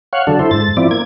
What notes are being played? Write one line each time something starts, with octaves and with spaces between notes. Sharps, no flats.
C#5 F5 F#5
D3 F#3 D4 A4
E4 A4 C5
G#2 A6
F3 C4 E4 D5
A#3 G#6